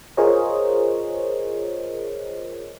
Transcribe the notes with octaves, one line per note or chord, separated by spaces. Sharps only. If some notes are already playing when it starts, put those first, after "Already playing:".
F4 G#4 A#4 C5 C#5 D#5